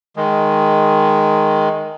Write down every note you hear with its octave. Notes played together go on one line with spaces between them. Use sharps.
D#3 G#3